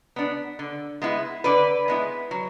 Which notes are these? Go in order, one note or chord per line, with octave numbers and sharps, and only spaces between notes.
B3 D4
D3
G#3 B3 E4
D3 B4 D5
G#3 B3 E4
F#3